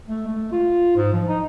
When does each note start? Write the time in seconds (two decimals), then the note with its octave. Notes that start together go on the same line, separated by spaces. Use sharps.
0.07 A3
0.27 A3
0.52 F4
0.96 G#2
1.13 F3
1.28 D#4